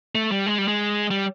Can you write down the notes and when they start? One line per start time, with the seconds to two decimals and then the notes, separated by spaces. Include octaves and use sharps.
0.15 A3
0.32 G3
0.46 G#3
0.58 G3
0.68 G#3
1.11 G3